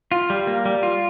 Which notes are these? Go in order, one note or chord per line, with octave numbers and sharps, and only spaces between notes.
F4
G3
A#3
G3
F4